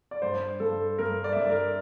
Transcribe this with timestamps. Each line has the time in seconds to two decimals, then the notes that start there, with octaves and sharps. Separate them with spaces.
0.11 D5
0.22 G2 C5
0.60 G2 A4
0.98 G2 A#4
1.24 D5
1.33 E5
1.37 G2 D5
1.50 A#4